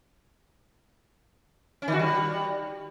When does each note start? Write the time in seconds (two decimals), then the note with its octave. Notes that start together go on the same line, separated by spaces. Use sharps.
1.82 C#4
1.88 D#3
1.93 F#4
1.99 G3